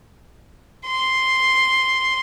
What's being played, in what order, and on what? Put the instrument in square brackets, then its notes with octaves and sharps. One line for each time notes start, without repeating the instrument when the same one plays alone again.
[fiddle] C6